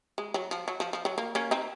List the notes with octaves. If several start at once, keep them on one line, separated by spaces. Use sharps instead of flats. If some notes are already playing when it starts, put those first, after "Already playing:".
G#3
F#3
F3
F#3
F3
F3
F#3
A#3
A#3 C#4
C4 D#4